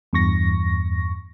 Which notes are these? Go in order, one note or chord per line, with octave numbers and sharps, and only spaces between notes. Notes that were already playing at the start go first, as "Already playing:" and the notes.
E2 G2 C#6 A#6